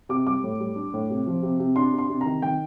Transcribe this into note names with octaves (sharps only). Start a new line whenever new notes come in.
C3 D6
G3 D6
A2
G3
D4
A2
C3
F3
C3
C3
D4 C6
C3
C6
C3
D#3 A#5
D#3 G5